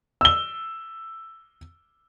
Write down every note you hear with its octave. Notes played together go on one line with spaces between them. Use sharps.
E6 G7